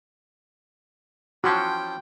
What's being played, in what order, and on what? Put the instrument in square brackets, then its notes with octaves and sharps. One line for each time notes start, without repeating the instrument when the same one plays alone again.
[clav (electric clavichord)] E3 F3 C#4 [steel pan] F#4 [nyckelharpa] G5 [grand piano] A5 C6 F#6